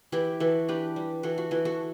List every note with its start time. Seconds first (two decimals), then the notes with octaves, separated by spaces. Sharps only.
0.12 E3 E4 G4
0.40 E3 F#4 A4
0.68 D4 G4 B4
0.96 G3
1.23 E3 F#4 A4
1.38 F#4
1.51 E3 F#4
1.65 F#4 A4